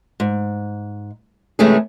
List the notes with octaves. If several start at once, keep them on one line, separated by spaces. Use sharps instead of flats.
G#2
C3 E3 G#3 A3 C#4 G#4